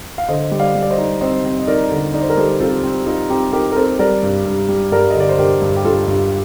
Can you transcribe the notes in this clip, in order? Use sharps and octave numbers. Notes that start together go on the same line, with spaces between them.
F5
D3 C5 D#5
G3
D5 F5
G3
D5
C5 D#5
D#4
C4 C5 D#5
C4
D#5
D#4 A#4 D5
D3
D#4 D5
C5
A#4
G3 A4 C5
C4 F4 A4
C4
D#4 F4
C4 D#4 G4
D#4 G4 A#4
A#4
C4 A4 C5
G3 A#4 D5
G2
G2
G3
G2 A#4 D5
D#5
D3 D5
C5
G2 G4 A#4
G2
G4
G2 F4 A4
G2